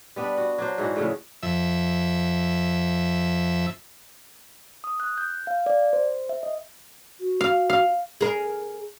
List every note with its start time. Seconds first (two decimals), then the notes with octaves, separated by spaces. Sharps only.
0.16 G3 B3 D4
0.38 F#4
0.58 F#3 D4 C5
0.78 G#2 E3 F#4
0.96 A2 C#3 F3 A3
1.43 F2 E5
4.84 D#6
5.00 F#6
5.18 G6
5.47 F5
5.66 D5
5.93 C5
6.29 E5
6.43 D#5
7.20 F#4
7.41 F5
7.70 F5
8.21 G#4 A#4